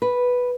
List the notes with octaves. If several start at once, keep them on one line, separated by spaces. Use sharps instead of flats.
B4